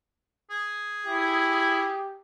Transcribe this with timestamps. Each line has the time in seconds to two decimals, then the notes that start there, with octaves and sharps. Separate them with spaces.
0.51 G#4
1.06 E4 G4